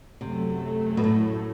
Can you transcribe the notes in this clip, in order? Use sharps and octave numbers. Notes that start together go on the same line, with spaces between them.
F#2 C3 F#3 A3
B2
A2